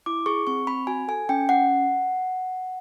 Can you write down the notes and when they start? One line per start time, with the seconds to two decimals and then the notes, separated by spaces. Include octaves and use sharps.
0.06 E4 D6
0.26 G#4 C#6
0.47 C4 C#6
0.67 C4 B5
0.87 F#4 G#5
1.08 A4 G#5
1.29 C#4 G5
1.49 C#4 F#5